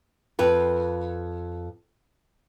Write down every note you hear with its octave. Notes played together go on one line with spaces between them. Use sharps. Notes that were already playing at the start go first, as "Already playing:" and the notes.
F2 B4 G5